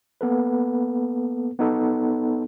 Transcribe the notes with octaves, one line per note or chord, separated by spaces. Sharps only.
A#3 B3 A4 B4
B3 D#4 A4